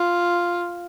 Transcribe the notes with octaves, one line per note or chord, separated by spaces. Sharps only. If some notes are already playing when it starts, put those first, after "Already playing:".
Already playing: F4